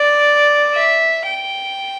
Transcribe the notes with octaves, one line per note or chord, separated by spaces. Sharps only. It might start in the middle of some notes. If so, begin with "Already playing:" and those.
Already playing: D5
E5
G5